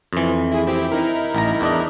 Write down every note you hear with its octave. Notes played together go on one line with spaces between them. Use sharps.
F2 E3
E4 G#4
C4 E4 G4
D#4 E4 A#4
A1 A#5
E2 D4 D#5